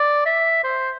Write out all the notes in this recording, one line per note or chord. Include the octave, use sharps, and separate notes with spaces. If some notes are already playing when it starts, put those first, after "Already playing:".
Already playing: D5
E5
C5